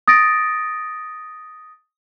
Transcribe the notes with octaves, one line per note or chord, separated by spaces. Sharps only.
D#6 A6 A#6 D7